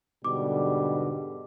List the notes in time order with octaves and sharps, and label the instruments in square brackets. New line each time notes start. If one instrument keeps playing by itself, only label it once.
[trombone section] G#2 B2 D3 [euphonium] G3 [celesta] D6